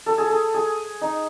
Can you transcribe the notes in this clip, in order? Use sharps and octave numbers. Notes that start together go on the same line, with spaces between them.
A4
G#4
A4
G#4
D#4